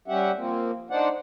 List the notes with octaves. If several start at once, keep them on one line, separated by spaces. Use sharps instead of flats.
G3 C#4 G4 E5 F#5
F3 A#3 C4
D4 D#4 C5 D5 F#5